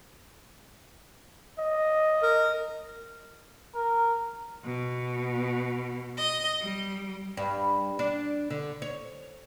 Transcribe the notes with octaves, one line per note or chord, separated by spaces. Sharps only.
D#5
A#4
A#4
B2
D#5
G3
G2
D4
D3
C#5